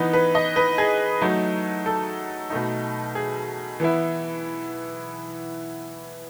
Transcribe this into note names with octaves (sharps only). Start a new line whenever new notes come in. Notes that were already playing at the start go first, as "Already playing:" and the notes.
Already playing: E3 B3 D#4
B4
D#5
B4
G#4
F#3 A3 D#4
A4
B2 A3 D#4
G#4
E3 B3 E4